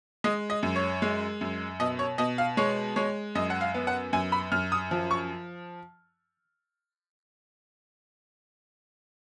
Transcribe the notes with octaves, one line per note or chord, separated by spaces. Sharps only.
G#3 D#5
D#5
F#2
C#5
G#3
F#2
B2 D#5
C#5
B2 D#5
F5
G#3 C#5
G#3 C#5
F#2 D#5
F#5
F5
B3
F#5
F#2 G#5
B5
F#2 F6
D#6
F3
C#6